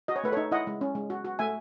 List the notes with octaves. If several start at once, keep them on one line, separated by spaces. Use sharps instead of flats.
F#4 D#5
C#5
A3 B4
A4 C#5
D#4
E4 D#5 F#5
G#3
C#4
G#3
F#4
F#4
A3 E5 G#5